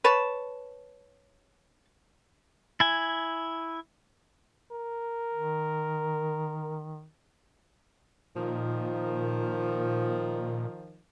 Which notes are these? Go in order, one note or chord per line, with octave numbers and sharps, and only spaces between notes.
B4 C#5 A5
E4 G#5
A#4
D#3
A#2 D#3 F3